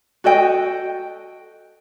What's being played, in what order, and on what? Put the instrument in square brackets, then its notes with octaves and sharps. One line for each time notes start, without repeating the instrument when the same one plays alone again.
[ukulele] F#4 A4 D#5 G5